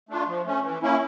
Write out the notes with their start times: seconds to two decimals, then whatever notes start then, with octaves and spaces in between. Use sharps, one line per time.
0.09 A3 D4 F4
0.27 F3
0.45 A3 C#4
0.64 E3
0.82 A#3 C#4 E4